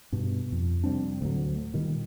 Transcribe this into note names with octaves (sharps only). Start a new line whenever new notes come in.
G2 B2
F2
C3 G3 C4 D4
D2 A2 F#3
A#2 D#3 G3